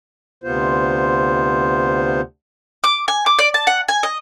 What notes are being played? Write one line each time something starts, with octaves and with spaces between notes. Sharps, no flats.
D2 C3 B3 F4 C5
D6
G#5
D6
D5
A5
F#5
G#5
D#5